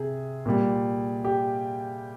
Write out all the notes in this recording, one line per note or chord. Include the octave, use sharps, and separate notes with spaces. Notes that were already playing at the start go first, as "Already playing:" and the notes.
Already playing: C3 G#4
A#2 G3
G4